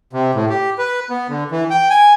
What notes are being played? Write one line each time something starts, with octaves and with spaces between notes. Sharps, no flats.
C3
A2
G4
B4
B3
D3
E3
G5
G#5